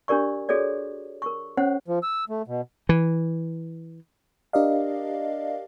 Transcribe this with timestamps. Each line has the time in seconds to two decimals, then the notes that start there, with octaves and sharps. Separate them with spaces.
0.08 D4 G4 A#4 D5 C#6
0.49 F#4 G#4 A4 C#5 D5
1.22 A#4 C#6
1.57 C#4 C5 C#5 F#5
1.88 F3
2.03 E6
2.29 A3
2.48 B2
2.89 E3
4.53 D4 G4 A#4 D5 D#5 F5